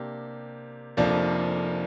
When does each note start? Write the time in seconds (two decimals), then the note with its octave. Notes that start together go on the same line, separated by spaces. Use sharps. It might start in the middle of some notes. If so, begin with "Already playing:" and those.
Already playing: C3 A#3 D4 G4
0.97 F1 F2 F3 A#3 D4